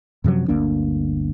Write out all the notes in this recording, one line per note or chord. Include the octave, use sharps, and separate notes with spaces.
F#2 C3 F3 F#3
G1 D2 A#3 D4